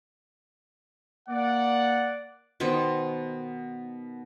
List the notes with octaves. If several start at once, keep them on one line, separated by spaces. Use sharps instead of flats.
A#3 D5 F#5
B2 D#3 B3 C5